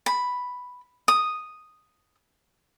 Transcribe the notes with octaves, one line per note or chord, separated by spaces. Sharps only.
B5
D#6